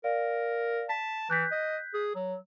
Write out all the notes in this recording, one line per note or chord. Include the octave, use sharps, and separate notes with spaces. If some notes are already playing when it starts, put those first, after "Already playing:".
A#4 D5 F5
A5 B6
E3 F#6 G6 B6
D#5
G#4
F#3